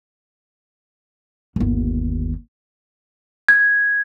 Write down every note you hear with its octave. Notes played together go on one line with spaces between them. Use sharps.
G1 D#2
G#6